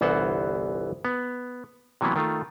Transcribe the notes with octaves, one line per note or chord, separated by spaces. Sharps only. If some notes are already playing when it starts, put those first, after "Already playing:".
G1 C2 E3 B3 C5 F#5
B3
C3 E3 F#3 A#3 B3
D#3 A3 F4